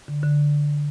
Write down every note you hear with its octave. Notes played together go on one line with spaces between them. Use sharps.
D3
D3